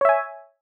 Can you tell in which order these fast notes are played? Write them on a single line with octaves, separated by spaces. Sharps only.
C#5 E5 G#5